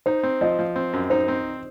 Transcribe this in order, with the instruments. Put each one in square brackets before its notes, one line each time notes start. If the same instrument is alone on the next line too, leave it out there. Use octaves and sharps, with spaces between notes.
[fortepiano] D#4 [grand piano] C5
[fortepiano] C4
[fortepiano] F3 [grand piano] D#5
[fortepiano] F3
C4
F#2
[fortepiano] D#4 [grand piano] C5
[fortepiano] C4